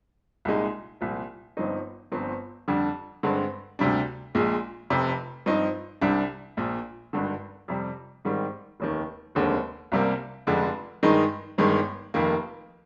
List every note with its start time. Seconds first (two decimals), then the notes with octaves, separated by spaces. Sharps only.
0.45 C2 A#2 G#3 D#4
1.01 C2 A#2 F3
1.57 G1 G2 F3 C4 D#4
2.12 G1 G2 F3 C4
2.68 F2 D3 G3 D4
3.23 G2 D3 G#3 C4
3.79 D2 C3 G3 D4
4.35 A#1 A#2 G#3
4.90 F1 F2 C3
5.46 G2 F3 C4 D#4
6.01 C2 C3 G3 D4
6.57 A#1 A#2 F3
7.13 G#1 G2 D3
7.68 F2 C3 G3
8.25 G#2 D#3 G3 C4
8.80 F1 D#2 D#3
9.35 F1 D#2 D3 G#3 C4
9.92 C2 C3 G3 A#3
10.47 F1 F2 D3 G#3 D4
11.03 G2 D#3 G#3 D#4
11.58 G1 G2 D#3 G#3
12.14 F1 F2 D#3 A#3